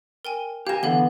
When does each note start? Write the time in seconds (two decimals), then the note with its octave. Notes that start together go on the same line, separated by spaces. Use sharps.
0.25 A#4 G5 G#5
0.67 G4 A#4 F5 G#5 E7
0.83 D3 E3 B3 D4 A4 F5 G7